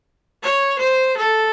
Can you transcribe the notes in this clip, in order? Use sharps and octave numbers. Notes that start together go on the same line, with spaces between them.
C#5
C5
A4